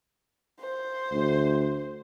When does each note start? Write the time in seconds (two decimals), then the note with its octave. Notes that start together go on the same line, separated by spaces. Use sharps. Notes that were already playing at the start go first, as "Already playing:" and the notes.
0.61 C5
1.12 D2